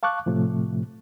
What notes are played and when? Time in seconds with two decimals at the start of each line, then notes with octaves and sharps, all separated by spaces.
0.03 F5 A5 C#6 D6 F#6
0.26 A2 C3 F3 A3